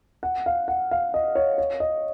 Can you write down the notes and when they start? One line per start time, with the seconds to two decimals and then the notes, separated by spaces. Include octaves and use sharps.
0.23 F#5
0.46 F5
0.68 F#5
0.91 F5
1.14 D#5
1.35 C#5
1.58 C#5
1.80 D#5